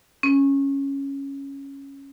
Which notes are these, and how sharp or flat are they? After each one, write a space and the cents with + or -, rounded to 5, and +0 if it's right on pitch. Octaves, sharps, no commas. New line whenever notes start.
C#4 -5